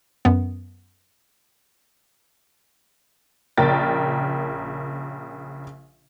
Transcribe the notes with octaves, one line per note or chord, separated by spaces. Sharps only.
F#2 B3
A#1 C#3 A#4 G5 A6